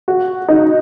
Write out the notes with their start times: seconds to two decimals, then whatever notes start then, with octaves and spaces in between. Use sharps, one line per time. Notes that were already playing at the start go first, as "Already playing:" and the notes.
0.08 F#4
0.49 D#4